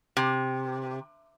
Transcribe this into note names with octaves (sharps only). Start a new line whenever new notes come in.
C3